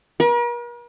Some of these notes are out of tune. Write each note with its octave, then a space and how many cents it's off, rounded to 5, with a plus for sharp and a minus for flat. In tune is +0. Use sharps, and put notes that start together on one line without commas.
A#4 +45